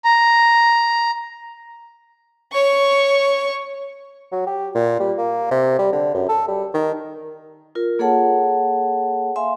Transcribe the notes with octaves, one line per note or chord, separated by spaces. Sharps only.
A#5
C#5 C#6
F#3
G4
A#2
G3
A#3
C3
G3
D3
F#2
A4
G3
D#3
F4 A#4
A#3 G#4 A4 C#5 F#5 A5
E5 F5 G#5 C6